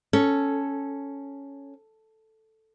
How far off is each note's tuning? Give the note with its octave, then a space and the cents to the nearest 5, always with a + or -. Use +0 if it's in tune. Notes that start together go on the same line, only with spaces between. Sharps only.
C#4 +0 A4 +0